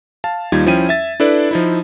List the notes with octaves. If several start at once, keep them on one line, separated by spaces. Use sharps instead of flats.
F5 A5
D#2 G3 D#4 F4 G#6
F3 C#4 E4 G5 D#7
E5 A6
D4 E4 A4 B4 D5
F3 D#4 E4